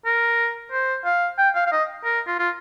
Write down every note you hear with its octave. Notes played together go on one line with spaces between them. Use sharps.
A#4
C5
F5
G5
F5
F5
D#5
A#4
F4
F4